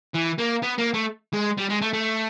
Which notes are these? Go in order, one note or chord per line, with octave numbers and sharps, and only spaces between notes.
E3
A#3
B3
A#3
A3
G#3
G3
G#3
A3
A3